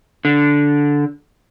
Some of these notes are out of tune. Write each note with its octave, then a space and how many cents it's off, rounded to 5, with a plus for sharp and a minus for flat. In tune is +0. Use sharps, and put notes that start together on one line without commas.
D3 -10